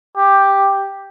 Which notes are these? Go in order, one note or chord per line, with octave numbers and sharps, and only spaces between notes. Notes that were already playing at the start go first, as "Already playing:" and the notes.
G4